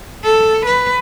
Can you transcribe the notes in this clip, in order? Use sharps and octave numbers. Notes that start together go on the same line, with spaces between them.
A4
B4